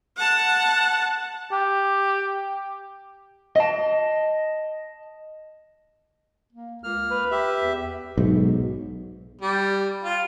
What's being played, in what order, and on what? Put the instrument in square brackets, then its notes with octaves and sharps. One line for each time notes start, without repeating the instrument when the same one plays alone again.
[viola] F#5 A5
[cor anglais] G4
[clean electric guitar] D#5 A5
[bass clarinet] A#3
[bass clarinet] C#2 [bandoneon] A#3 F6
[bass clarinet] B4
[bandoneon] G4 E5
[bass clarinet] E2
[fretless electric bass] B1 G#2
[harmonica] G3
F4